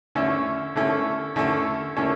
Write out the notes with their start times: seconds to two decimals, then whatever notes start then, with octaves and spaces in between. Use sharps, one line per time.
0.15 D3 A3 C#4 E4 A4
0.76 D3 A3 C#4 E4 A4
1.36 D3 A3 C#4 E4 A4
1.96 D3 A3 C#4 E4 A4